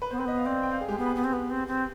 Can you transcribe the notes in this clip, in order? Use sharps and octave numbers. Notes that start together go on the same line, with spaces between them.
B4
B3 C5
C4 B4
B3 D#5
F5
C4 D5
G5
F5
G#4
G#3 G4
B3 G#4
B4
B3
C4
B3
C4
C4